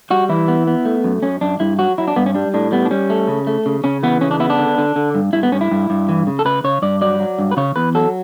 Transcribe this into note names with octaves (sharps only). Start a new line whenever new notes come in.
G3 F#4
E3 E4
B3
B3
A3
F#2
F#2 C#4
F#2 D4
G2 E4
F#3 F#4
F#3 E4
D4
G2 B3
C#4
G3 D4
A2 D4
G3 B3
D4
G3 C#4
A3
C#3
A3
C#3
C#3 C#4
E3 B3
C#3 C#4
D4
B3 E4
D4
D3
D3
D3
G2
G2 E4
B3
G2 C#4
E4
G2
G2
E3
C#3
A4
C#3 B4
C#3 C#5
G2 D5
F#3 D5
F#3
G2
B4
C#3 C#5
E2 B4
F#3 A4